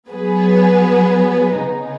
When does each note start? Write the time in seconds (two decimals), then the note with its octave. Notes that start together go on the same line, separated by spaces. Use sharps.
0.11 F#3 B3 G#4 B4
1.56 C#3 B3 D#4 G#4